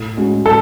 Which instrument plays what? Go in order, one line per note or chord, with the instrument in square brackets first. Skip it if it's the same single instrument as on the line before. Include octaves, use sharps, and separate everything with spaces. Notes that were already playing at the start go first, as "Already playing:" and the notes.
Already playing: [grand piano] A2
G#3 C#4 F#4
[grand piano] A2 [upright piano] A4